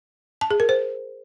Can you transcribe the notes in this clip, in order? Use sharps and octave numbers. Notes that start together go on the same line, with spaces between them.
A5
G#4
A#4
C5